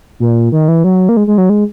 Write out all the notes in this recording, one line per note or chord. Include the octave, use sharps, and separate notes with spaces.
A#2
D#3
E3
F#3
A#3
G#3
G#3
F#3
G#3